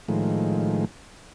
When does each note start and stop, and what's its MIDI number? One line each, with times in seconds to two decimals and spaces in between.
0.08 0.85 45
0.08 0.85 51
0.08 0.85 53
0.08 0.85 56